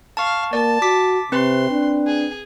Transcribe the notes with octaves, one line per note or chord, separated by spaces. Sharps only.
F5 A5 C#6
A#3 D5 A5
F#4 D6 B6
C3 C4 B4 C6
D4
G#4